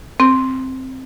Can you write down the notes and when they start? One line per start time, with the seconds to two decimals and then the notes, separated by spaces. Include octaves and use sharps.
0.20 C4